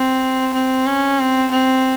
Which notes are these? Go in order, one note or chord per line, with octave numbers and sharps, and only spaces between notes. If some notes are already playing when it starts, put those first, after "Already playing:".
Already playing: C4
C4
C#4
C4
C4